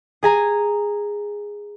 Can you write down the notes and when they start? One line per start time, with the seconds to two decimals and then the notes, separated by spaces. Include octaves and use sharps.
0.23 G#4 G#5 A#5